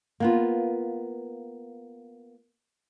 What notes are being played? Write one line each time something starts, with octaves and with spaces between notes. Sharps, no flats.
A#3 B3 F4